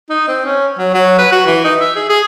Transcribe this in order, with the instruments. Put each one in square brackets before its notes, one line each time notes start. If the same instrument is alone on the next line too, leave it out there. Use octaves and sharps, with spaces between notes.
[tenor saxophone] D#4
C4
C#4
F#3
F#3
B4
F#4
E3
D#4
E5
G#4
G#4